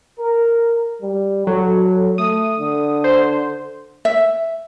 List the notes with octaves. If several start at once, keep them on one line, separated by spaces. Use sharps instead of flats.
A#4
G3
F#3 A4
A3 D#6
D3
C5
E5